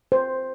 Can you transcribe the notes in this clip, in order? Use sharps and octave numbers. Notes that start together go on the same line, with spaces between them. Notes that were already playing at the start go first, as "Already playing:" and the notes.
C5